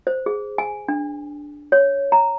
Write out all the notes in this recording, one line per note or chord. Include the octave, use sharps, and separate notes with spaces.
C5
G#4
G#5
D4
C#5
A#5